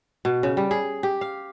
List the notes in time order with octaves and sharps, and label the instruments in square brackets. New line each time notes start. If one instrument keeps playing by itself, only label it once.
[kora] B2
C#3
G3
G#4
G4
F5